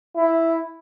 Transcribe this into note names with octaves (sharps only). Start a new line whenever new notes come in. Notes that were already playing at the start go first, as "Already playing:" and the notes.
E4